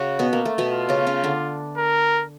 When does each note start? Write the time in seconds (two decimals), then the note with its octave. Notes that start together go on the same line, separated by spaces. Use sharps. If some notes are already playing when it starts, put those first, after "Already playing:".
Already playing: C#3 C#4 F#4
0.19 B2 B3
0.33 A#3
0.45 A3
0.58 B2 B3
0.71 F4
0.89 C#3 C#4
1.07 C#3 C#4
1.24 D3 D4
1.77 A#4